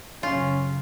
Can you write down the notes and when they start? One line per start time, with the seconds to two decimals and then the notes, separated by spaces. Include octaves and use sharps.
0.23 F#2 C#3 C#4 F4